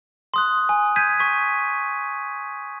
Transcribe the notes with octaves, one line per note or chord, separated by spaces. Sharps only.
C6 D#6 F#6
G#5
G6 G#6 B6 D#7
C#6 B6